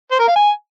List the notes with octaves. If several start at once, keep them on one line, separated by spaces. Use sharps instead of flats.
C5
A#4
F5
G#5